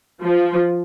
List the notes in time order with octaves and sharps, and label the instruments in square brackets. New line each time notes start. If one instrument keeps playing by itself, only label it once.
[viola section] F3